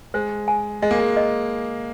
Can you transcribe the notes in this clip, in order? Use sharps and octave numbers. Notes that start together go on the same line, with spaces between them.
G#3 C5
G#5
G#3 D#5
A#3
G#3
D#5